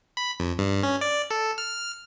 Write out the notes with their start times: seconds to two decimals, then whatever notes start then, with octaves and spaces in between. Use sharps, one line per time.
0.17 B5
0.40 F2
0.59 G2
0.83 C#4
1.01 D5
1.31 A4
1.58 F6